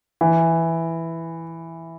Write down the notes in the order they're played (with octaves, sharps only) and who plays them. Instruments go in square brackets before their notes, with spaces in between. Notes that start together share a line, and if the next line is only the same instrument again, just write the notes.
[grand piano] E3